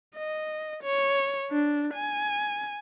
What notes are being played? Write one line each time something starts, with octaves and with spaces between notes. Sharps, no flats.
D#5
C#5
D4
G#5